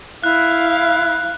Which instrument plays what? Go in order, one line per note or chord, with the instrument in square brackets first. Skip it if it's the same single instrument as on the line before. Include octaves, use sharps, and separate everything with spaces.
[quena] E4 [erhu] F5 [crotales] F#6